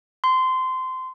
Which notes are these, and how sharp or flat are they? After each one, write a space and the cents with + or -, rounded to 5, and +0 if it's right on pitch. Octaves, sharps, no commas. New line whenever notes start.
C6 -20